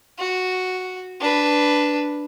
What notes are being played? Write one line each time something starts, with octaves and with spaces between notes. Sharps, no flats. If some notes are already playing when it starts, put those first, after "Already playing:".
F#4
D4 B4